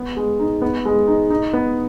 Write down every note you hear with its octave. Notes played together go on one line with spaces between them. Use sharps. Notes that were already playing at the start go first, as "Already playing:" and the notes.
Already playing: B3
G#3
D#4
B3
G#3
D#4
D#4
B3